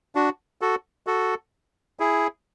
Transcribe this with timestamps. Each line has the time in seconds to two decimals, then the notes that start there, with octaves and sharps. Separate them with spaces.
0.15 D4 F#4
0.61 F#4 A4
1.07 F#4 A4
2.00 E4 G#4